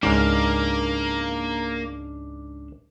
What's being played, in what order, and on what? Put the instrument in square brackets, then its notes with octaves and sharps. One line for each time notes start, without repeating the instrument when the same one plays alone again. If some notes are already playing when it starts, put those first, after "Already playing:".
[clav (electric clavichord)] C#2 G#2 [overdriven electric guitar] A#3 [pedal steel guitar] D4 F5